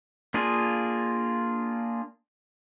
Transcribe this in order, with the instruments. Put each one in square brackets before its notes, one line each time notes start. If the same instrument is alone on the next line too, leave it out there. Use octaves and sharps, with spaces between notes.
[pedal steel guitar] A#3 D4 F4 G#4